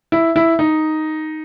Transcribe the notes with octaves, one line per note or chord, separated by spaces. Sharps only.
E4
E4
D#4